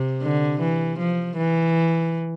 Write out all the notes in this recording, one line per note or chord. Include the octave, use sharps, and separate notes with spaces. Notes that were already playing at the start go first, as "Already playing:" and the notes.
Already playing: C3
D3
E3
F3
E3